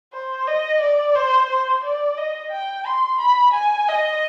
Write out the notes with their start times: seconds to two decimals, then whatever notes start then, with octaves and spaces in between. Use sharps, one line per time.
0.13 C5
0.47 D#5
0.81 D5
1.16 C5
1.50 C5
1.84 D5
2.18 D#5
2.52 G5
2.86 C6
3.20 B5
3.54 G#5
3.88 D#5